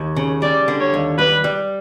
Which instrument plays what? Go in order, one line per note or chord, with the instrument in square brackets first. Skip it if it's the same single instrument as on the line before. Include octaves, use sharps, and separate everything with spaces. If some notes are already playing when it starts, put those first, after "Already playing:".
Already playing: [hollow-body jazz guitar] D#2
C#3
[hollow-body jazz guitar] G3 [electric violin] D5
[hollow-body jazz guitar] D3
[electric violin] C#5
[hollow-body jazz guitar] D#2
[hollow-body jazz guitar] G3 [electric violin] B4
[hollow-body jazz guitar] G3